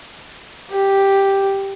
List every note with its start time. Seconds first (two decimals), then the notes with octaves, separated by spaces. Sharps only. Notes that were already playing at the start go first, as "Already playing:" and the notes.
0.71 G4